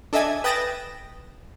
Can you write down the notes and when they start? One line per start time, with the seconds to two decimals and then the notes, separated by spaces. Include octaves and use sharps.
0.13 D4 A4 D#5 E5 G#5 G#6
0.44 B4 G5 D#6 A6 A#6 E7